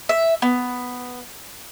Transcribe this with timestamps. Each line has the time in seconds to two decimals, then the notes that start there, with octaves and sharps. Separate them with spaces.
0.09 E5
0.42 B3